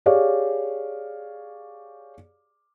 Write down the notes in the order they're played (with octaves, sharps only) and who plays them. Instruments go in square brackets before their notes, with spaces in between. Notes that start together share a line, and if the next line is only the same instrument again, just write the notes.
[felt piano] G4 G#4 C#5 D5 F5